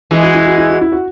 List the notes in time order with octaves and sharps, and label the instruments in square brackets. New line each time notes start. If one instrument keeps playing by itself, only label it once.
[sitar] E3 G#3 [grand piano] E4
[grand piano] F#4
E4
F#4
E4
F#4
E4
F#4